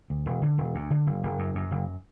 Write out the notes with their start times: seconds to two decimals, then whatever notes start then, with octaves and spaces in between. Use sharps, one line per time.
0.10 D2
0.26 E1
0.42 D3
0.58 E1
0.75 D2
0.91 D3
1.07 F#1
1.23 F#1
1.39 F#2
1.55 F#2
1.71 F#1